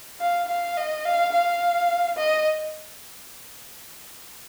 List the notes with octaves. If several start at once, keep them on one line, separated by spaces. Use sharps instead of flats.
F5
F5
D#5
F5
F5
D#5